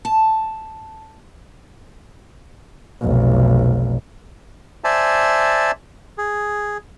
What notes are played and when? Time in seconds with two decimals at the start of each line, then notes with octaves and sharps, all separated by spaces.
0.05 A5
3.01 F1 B1
4.84 C5 D5 E5 G#5 A5
6.18 G#4